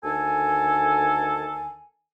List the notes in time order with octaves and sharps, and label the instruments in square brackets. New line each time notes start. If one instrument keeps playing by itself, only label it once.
[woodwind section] D2 D#3 A4 G#5